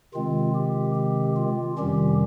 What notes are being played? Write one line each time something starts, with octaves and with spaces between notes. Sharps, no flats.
C3 D#3 G#3 C4 F4
G4
G4
F4
F2 C3 D#3 G3 C#4 G4